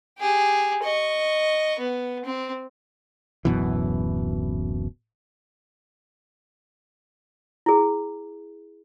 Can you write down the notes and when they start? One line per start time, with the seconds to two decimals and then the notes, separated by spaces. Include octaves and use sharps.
0.18 G4 G#4
0.83 D#5 C#6
1.79 B3
2.25 C4
3.45 D1 F#2 B2 E3
7.66 E4 G#4